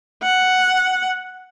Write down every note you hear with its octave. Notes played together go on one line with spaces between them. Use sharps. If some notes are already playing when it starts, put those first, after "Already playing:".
F#5